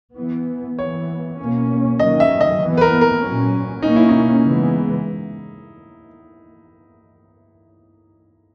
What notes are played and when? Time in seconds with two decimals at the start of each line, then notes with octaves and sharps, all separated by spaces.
0.17 E3 B3
0.79 E3 B3 C#5
1.39 B2 A#3 C#4
1.99 D#3 F#3 A#3 C#4 D#5
2.20 E5
2.41 D#5
2.61 E3 B3
2.77 B4
2.81 A#4
3.01 A#4
3.23 A#2 F#3 C#4
3.82 B2 A#3 C#4 D#4
3.96 E4
4.09 D#4
4.44 C#3 E3 G#3 B3